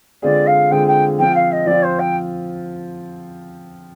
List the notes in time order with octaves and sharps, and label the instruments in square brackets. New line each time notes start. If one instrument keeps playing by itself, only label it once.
[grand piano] D3 G#3 C4 F4 G#4 [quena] D5
[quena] F5
[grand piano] D3 G#3 C4 F4 G#4 [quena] G5
[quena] G5
[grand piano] F3 C4 F4 [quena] G5
[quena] F5
D#5
[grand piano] F3 C4 F4 [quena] D5
[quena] C5
G5